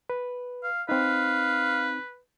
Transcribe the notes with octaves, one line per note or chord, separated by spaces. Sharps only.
B4
F5
C4 D#4 B4 F5